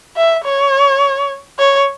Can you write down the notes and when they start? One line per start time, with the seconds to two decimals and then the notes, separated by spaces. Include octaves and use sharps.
0.17 E5
0.45 C#5
1.59 C#5